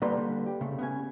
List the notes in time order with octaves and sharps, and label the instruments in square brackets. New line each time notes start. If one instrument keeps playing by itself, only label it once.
[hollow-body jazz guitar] D3 G3 A#3 B4 A#5 C6
G4
C#3 A3
B3 C#4 G#5